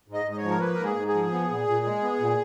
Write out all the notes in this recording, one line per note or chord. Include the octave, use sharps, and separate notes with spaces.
G#2
D#5
G#2
D#5
C#5
F3
A#4
A#3 B4
G#2 A#4
G#4
G#2
G#4
F3
B3
A#2
A#2
G#3
B3
A#2